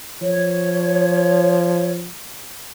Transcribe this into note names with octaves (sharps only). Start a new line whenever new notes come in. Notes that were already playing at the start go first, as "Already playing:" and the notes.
F3 C#5